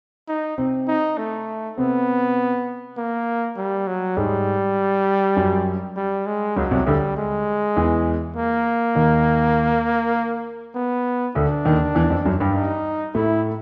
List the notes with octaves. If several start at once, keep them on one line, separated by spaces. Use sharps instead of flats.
D#4
C3 C4
D#4
A3
C3 B3 C4
A#3
G3
F#3
G#2 G3 G#3
F#2 F#3
G3
G#3
C#2 C#3 F#3
C2 C3
D2 D3 G3
G#3
E2 E3
A#3
D#2 D#3
B3
D2 D3 D4
D#2 D#3
E2 E3
F2 F3
F#2 F#3
G2 G3
D#4
A2 A3 E4